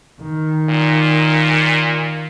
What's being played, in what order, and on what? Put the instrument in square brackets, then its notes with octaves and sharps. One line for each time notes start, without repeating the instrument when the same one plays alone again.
[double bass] D#3
[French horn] A#2